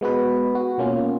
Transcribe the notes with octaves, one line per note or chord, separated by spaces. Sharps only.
G#3 B3 F#4 B4
F#4
B2 A#3 C#4 F4